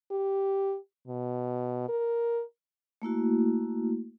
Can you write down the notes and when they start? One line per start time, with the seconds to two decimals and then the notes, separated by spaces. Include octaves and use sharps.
0.11 G4
1.08 B2
1.89 A#4
3.02 A3 A#3 E4 F#4